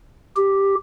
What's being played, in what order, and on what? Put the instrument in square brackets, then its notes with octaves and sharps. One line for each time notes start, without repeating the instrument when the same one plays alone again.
[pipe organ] G4